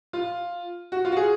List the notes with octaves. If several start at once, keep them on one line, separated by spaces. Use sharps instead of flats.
F4
F#4
F4
F#4
G#4